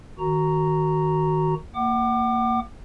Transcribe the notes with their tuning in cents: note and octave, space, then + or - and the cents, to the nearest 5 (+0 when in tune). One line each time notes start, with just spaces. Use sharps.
D#3 +0 F#4 +10 A#5 -5
A#3 -20 F#5 +30 D6 +30